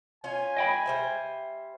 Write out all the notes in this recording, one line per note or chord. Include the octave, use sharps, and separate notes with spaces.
C#4 F4 G#5
D#5 G5 B5
G3 C5 E5